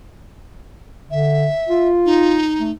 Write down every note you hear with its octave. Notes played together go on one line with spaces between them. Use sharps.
D3 E5
F4
D#4
A3